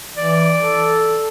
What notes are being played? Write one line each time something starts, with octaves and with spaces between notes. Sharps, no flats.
E3 D5
A4